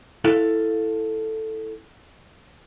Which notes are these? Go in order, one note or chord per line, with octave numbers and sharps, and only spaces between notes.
E4 F4 A4 F5